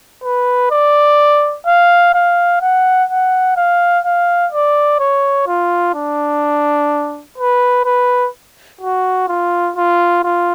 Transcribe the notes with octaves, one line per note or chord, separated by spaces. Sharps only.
B4
D5
F5
F5
F#5
F#5
F5
F5
D5
C#5
F4
D4
B4
B4
F#4
F4
F4
F4